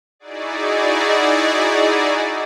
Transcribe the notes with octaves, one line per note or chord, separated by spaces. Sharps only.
D#4 E4 F#4 G#4 D5